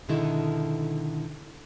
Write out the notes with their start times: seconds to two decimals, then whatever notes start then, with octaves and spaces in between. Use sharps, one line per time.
0.09 B2 D3 D#3 G#3 E4 A4